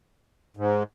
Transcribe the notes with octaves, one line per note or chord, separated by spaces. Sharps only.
G#2